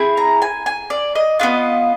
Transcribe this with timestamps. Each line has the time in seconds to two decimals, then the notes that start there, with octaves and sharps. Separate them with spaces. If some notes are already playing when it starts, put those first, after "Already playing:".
Already playing: C4 E4 G#4
0.17 A#5
0.42 G#5
0.66 G#5
0.90 D5
1.15 D#5
1.40 B3 D4 F4 D#5